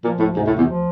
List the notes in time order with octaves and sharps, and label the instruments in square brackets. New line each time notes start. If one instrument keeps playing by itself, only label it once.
[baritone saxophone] A#2 [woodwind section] F3
[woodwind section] D2 [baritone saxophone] A2
[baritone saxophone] G#2 [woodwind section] C3
[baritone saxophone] A2
[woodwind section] D2
[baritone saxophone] E2
[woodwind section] F3